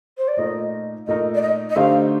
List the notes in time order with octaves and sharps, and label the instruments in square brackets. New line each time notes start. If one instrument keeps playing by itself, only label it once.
[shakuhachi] C5
D5
[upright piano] A#2 A3 D#4 A#4 [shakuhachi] D#5
[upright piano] A#2 A3 D#4 A#4 [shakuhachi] D#5
[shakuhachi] D5
D#5
D#5
[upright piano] D3 A3 D#4 G4 C5 [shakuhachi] F5